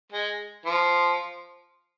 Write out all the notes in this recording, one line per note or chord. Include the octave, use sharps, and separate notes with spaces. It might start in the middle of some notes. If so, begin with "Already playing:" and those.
G#3
F3